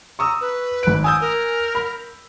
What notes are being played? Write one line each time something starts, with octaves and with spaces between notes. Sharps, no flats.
A#5 C#6 D#6 E6
B4
G#1 D7
G#5 D#6 E6 G6
A#4
B5